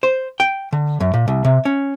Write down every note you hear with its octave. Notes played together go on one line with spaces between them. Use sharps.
C5
G5
D3
F#2
A#2
C2
C3
C#4